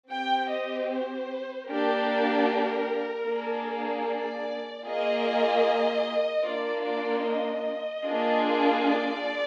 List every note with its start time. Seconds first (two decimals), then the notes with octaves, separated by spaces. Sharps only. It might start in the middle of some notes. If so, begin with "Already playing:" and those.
0.11 C4 G4 G5
0.50 D#5
0.90 C5
1.70 A#3 D4 G4 A#4
3.28 A#3 D4 G#4
4.07 D5
4.86 A#3 F4 G#4 D#5
6.44 A#3 D4 F4 D5
6.85 D5
7.24 D#5
8.03 A#3 D4 F4 G#4
8.82 D5